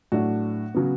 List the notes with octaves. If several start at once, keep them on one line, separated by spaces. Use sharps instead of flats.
A2 F#3 A3 D4 F#4
C#3 F#3 B3